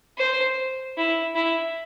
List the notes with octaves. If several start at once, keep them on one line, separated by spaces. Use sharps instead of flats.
C5
E4
E4